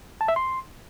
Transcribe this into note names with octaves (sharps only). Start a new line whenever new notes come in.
A5
E5
C6